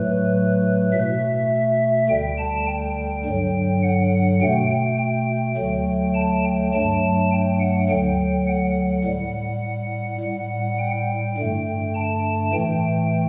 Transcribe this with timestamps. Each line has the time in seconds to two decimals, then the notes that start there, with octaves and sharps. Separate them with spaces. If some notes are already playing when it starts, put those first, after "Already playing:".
Already playing: A2 F#3 A3 B4
0.93 B2 A3 E5
2.09 D2 D3 G3 G5
2.38 A5
2.67 G5
3.25 G2 D3 F#3
3.83 F#5
4.42 B2 A3 G5
4.71 G5
4.99 G5
5.57 D2 D3 F#3 A3
6.15 A5
6.44 G5
6.73 G2 F#3 A3 A5
7.31 G5
7.60 F#5
7.89 D2 D3 F#3 G5
8.47 F#5
9.05 A2 G3
10.21 A2 G3
10.79 G5
11.37 G2 D3 A3
11.95 A5
12.53 A2 E3 A3 G5